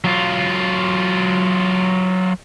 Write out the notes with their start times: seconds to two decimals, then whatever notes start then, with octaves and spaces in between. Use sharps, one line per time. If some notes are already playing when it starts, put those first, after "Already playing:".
0.04 F#3 F4